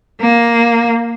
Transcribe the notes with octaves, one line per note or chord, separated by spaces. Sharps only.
A#3